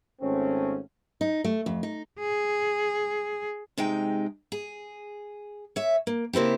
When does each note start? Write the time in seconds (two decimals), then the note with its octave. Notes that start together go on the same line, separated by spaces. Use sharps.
0.21 G#1 A3 C4 C#4
1.21 D#4
1.44 A3
1.66 F2
1.83 D#4
2.20 G#4
3.78 C3 G#3 D#4 G5
4.52 G#4
5.76 C#5 E5
6.07 A#3
6.33 C#3 A#3 C4 E4 G4